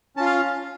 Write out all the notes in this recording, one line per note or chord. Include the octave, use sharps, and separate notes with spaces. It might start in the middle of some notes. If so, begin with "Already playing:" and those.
C#4 F4 A5
F5